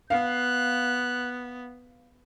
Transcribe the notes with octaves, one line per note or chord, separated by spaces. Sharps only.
B3 F5 F#6